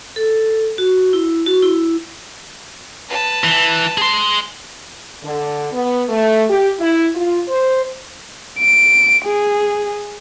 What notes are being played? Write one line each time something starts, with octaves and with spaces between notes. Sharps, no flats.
A4
F#4
E4
F#4
E4
B4 A5
E3
G#4 C6
D3
B3
A3
G4
E4
F4
C5
D7
G#4